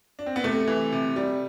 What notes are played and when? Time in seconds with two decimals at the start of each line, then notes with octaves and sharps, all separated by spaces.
0.19 D4
0.26 C4
0.36 B3
0.44 C3 A3
0.67 E3
0.92 C3
1.16 G3